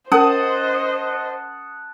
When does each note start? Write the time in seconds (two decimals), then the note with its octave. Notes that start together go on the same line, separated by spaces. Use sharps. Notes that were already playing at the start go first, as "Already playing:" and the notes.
0.12 C#4 A#4 C5 D#5 F#5 A5 D#6